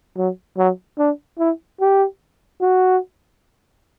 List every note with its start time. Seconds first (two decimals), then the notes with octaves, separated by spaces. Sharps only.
0.17 F#3
0.57 F#3
0.98 D4
1.38 E4
1.80 G4
2.61 F#4